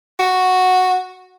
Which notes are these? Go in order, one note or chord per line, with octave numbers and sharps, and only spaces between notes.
F#4